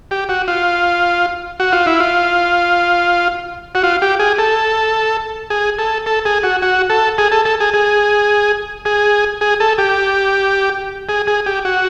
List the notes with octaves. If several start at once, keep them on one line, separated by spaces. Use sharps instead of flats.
G4
F#4
F4
F#4
F4
E4
F4
F#4
F4
G4
G#4
A4
G#4
A4
A4
G#4
F#4
F#4
A4
G#4
A4
A4
G#4
G#4
G#4
G#4
A4
G4
G#4
G#4
G4
F#4